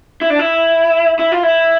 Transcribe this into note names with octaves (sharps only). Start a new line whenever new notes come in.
E4
D4
E4
E4
F4
E4